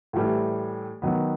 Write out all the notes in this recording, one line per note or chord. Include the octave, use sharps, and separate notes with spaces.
A2 E3 G3
D#3 F#3 B3